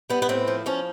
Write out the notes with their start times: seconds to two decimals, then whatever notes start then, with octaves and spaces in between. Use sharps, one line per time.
0.10 G3 B3
0.22 B3
0.29 A2 C4
0.47 F3
0.66 F3 C#4